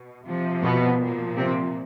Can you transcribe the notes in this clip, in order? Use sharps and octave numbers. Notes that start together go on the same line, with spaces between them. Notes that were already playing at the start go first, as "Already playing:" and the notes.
Already playing: B2
C3 F3
B2 B3
A#2 F3
C3 C4